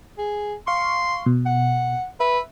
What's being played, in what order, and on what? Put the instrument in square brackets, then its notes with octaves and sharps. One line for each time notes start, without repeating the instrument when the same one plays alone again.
[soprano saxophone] G#4
[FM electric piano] F5 C#6 [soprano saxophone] C6
[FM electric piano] B2
[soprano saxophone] F#5
[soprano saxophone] B4 [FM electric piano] E5